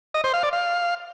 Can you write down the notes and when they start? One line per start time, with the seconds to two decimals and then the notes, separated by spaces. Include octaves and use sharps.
0.14 D#5
0.24 C5
0.34 F5
0.43 D5
0.53 F5